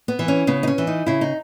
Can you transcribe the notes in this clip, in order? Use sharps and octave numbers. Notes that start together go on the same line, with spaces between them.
B3
E3
C#4
C#3 B3
D#4
C#4
E3
D#4
C#3 E4
D#4